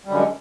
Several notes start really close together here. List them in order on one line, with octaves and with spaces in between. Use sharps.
G3 F#2 D3 G#3